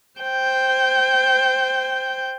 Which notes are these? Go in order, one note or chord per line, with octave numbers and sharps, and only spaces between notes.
C5 G5